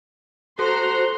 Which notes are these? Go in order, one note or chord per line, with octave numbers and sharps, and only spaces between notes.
F#4 A4 C5 A#5 C6